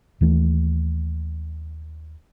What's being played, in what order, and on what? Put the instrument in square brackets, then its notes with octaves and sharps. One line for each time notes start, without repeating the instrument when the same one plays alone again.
[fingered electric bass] D#2 E3 A3